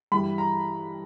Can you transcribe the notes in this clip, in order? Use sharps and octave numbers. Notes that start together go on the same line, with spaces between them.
G2 E3 G3 B5
A#5